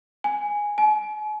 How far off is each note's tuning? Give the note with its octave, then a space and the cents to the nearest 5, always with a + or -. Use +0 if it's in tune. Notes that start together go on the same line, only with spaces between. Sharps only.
G#5 -5
G#5 +40